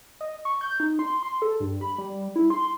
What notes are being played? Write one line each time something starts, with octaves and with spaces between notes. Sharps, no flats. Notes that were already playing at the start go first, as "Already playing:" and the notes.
D#5
C#6
G6
D#4
C6
C6
A4
G2
B5
G3
E4
C6